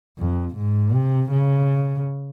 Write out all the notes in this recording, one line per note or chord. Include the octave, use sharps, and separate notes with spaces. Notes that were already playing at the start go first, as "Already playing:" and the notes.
F2
G#2
C3
C#3